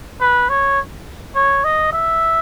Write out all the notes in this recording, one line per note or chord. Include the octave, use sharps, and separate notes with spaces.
B4
C#5
C#5
D#5
E5